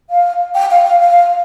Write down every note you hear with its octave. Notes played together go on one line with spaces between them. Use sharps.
F5
G5
F5
F5
F5